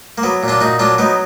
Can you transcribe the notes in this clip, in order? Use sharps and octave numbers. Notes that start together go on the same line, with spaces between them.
A#3
F#3 B3
A#2
D4 F4
A#2 D#4 F#4
F#3 D4 F4
F#3 B3 D#4